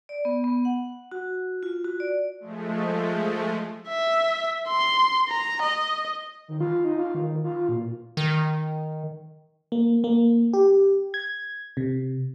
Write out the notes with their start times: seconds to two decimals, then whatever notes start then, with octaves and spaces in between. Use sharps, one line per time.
0.09 D5
0.25 B3
0.44 B3
0.65 F#5
1.12 F#4
1.63 F4
1.84 F#4
2.00 D5
2.40 F3 G#3 A3
3.88 E5
4.68 C6
5.29 A#5
5.63 D#5
6.48 D#3
6.60 F4
6.84 D#4
6.98 F4
7.15 D#3
7.44 F4
7.69 A#2
8.17 D#3
9.72 A#3
10.04 A#3
10.54 G4
11.14 G#6
11.77 C3